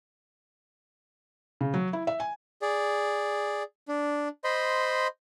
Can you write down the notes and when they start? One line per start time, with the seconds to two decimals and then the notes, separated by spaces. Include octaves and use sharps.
1.61 C#3
1.74 F#3
1.93 E4
2.07 E5
2.20 G#5
2.62 G#4 D5
3.88 D4
4.44 C5 D#5 B5 C6